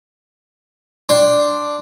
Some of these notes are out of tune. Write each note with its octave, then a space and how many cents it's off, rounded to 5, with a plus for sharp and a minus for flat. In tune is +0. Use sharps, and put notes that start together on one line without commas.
D4 +0 G5 +0 C6 +0